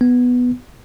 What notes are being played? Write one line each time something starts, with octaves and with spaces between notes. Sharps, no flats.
B3